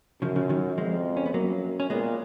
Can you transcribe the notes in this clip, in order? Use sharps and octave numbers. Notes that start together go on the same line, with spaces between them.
F#2 C#3 F3
C#3 F3
D#3 F#3
F2 F3 G#3
C#4
B3
F#2 F#3 A#3
C#4
A#2 G#3 B3